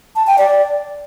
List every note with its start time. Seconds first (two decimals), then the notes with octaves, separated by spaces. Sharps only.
0.16 A5
0.27 G5
0.38 D5